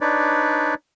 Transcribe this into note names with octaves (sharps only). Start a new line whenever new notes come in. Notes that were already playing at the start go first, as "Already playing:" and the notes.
D4 D#4 B4 C#5 D5